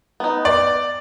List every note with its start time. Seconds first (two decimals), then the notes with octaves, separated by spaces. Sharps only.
0.20 B3 D#4
0.45 D5